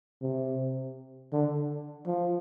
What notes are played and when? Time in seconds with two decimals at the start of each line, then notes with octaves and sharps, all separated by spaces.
0.22 C3
1.33 D3
2.07 F3